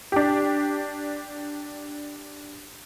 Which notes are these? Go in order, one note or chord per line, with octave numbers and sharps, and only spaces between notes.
D4 G4